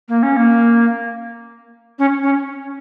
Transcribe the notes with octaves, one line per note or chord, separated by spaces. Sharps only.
A#3
C#4
A#3
C#4
C#4